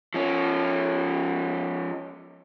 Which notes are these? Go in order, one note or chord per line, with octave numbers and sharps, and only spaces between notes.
F3 C#4